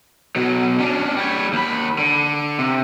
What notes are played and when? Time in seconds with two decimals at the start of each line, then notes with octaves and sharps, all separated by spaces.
0.36 B2 F#3
0.80 C#4 D4
1.16 G3 C#5
1.53 D#2 B5
1.98 D3
2.59 C3